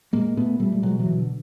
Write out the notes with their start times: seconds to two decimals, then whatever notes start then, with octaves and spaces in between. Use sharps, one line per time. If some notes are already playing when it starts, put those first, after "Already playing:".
0.13 A#2 G#3 A#3
0.37 A#2 A3 B3
0.59 A#2 G3 A3
0.72 G3
0.83 B2 F#3 G#3
0.99 E3 F#3
1.06 B2
1.17 D3